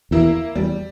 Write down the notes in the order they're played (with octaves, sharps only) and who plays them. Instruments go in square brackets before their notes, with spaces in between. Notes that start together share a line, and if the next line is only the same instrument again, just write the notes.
[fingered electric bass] E2 [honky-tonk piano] A#3 E4
[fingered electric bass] E2 [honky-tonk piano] G3